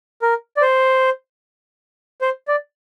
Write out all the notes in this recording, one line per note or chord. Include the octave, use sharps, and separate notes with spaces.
A#4
D5
C5
C5
D5